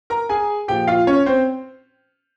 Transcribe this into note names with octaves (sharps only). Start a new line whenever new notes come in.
A#4 A#5
G#4 G#5
A#2 F3 G4 G5
F4 F5
C#4 C#5
C4 C5